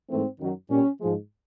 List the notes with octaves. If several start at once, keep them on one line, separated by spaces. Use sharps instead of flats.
G#2 E3 A3 C4
F#2 D#3 F#3
A#2 G3 C#4
G#2 F3 G#3